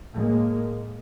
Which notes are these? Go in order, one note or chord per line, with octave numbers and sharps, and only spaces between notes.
A2 G#3 A#3